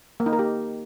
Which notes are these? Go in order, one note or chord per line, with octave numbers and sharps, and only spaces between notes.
A#3
D#4
A#4
G4